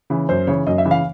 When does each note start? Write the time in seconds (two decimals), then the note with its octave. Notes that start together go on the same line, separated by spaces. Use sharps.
0.10 C#3 E3
0.29 F#2 C5
0.47 C#3 E3 C#5
0.67 F#2 D#5
0.78 E5
0.85 C#3 E3
0.91 F5